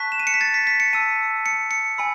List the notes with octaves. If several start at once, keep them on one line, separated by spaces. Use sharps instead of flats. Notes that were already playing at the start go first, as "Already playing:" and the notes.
Already playing: A5 C#6 F#6 B6
E7
D#7
C#7
B6
A6
B6
B6
C#7
A5 E6 D#7
C#7
C#7
G#5 B5 E6